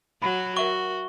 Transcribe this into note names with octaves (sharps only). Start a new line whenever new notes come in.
F#3 F#4 B5
F#4 A#4 E5 F#5 C#6 G7